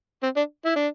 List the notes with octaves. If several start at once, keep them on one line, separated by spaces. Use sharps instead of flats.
C4
D4
E4
D4